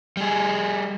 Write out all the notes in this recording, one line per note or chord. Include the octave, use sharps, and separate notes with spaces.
G3 G#4